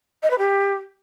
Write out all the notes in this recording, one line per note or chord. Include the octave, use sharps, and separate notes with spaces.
D#5
B4
G4